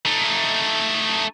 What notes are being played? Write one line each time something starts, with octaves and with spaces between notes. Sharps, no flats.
A3 D#4